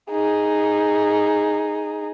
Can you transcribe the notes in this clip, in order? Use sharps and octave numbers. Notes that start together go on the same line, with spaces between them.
D#4 G#4